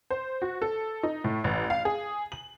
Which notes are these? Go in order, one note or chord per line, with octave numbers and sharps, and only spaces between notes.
C5
F#4
A4
D#4
A2
A1
F5
G#4
F#7